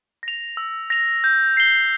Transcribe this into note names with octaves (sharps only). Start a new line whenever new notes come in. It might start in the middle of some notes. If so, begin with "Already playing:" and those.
A#6 F7
E6
A#6 F7
G6
C7 G7